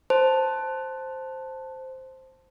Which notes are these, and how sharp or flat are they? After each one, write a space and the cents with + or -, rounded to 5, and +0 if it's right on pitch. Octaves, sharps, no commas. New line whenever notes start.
C5 +0 A5 +0